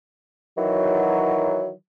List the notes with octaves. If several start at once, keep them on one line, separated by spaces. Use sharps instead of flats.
D#3 E3 F#3